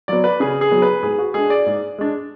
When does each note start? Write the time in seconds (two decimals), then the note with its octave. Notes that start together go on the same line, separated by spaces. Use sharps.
0.08 F#3 B3 D5
0.24 B4
0.40 C#3 G#4
0.61 G#4
0.71 F#3 B3
0.82 B4
1.03 G#2 G#4
1.18 F#4
1.34 G#3 D4 G#4
1.50 D5
1.66 G#2
1.98 G#3 D4